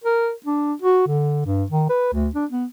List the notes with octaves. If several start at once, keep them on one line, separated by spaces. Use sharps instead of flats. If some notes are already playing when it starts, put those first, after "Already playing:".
A#4
D4
F#4
D3
G2
D#3
B4
D2
D4
B3